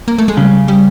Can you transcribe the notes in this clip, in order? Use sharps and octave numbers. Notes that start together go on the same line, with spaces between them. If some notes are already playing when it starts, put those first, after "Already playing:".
A#3
A3
G#3
C#3 G3
G3